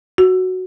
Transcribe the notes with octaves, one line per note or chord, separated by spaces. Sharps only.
F#4